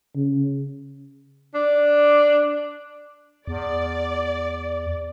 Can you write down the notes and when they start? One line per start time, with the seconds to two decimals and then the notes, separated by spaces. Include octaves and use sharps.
0.16 C#3
1.54 D4
3.48 E2 D5